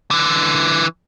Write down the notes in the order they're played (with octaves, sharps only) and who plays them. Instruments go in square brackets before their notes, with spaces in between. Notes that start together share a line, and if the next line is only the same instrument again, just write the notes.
[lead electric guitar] D3 E3